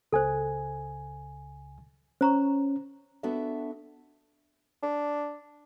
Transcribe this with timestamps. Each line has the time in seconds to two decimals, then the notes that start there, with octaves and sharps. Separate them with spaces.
0.13 C#2 A4 C5 G#5
2.21 C#4 C5 A#5 C#6
3.23 B3 D4 F#4 A4 E5
4.83 D4